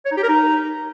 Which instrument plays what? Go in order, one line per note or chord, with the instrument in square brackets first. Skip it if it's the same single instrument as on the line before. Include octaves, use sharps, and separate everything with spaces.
[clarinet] C#5
D#4
G4
A#4
D#4